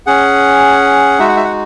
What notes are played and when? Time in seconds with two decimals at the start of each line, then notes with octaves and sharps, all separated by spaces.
0.07 C#4 G#4 F#5
1.19 G#3 D#4 F#4 E5
1.28 F#5
1.36 E5
1.44 F#5